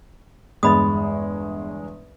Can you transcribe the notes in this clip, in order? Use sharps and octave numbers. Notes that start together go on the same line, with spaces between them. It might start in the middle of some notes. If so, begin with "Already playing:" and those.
G1 E2 G#3 D#5 B5 D#6